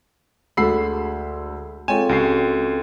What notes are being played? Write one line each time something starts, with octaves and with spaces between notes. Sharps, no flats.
D2 G#3 F#4 G#4 A4 B5 E6 C7
G#3 C4 F4 A4 C#5 G5 G#5
C#2 F#4 G4 C7